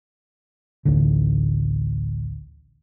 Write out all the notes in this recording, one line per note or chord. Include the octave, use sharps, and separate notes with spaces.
A1 D2 D3